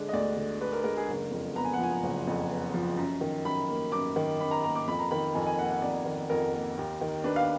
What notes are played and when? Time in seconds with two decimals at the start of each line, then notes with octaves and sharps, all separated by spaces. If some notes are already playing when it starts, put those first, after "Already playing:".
Already playing: D3 G#3 D4
0.09 D#5
0.13 D2 D5
0.37 D3
0.61 D4 B4
0.73 A#4
0.84 G#3 A#4
0.97 G#4
1.08 F#1 A#4
1.31 F2
1.55 B3 A#5
1.65 G#5
1.73 F#5
1.79 F3 G#5
2.03 F#1
2.27 F2
2.50 B3
2.74 F3
2.97 F#2
3.21 D#3
3.45 F#2 B5
3.69 A#3
3.92 F#2 D6
4.16 D#3
4.40 F#2 B5
4.51 A#5
4.63 A#3 A#5
4.75 D6
4.88 F2 B5
4.99 A#5
5.11 D#3 B5
5.35 F2 G#5
5.47 G#5
5.58 A#3 F#5
5.65 G#5
5.70 F#5
5.82 F2 D5
6.06 D#3
6.30 F2 A#4
6.53 A#3
6.77 D#2
7.01 D#3
7.24 D4 B4
7.36 F5